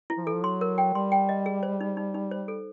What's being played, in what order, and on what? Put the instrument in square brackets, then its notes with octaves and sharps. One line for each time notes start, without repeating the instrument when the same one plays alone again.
[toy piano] E4
[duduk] F3
[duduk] E3 [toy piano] A4
[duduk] F3
[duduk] F#3 [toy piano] C6
[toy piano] A#4
G5
[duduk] G3 [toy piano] C6
[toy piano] G5
D#5
G#4
C5
D#4
D#4
D#4
C5
A4